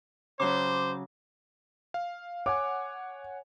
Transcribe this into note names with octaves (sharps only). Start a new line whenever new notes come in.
C#3 F#3 C#4 C5 D6
F5
C#5 F#5 G#5 D6